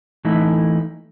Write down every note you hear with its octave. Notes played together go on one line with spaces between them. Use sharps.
E3 A3 D#4 E4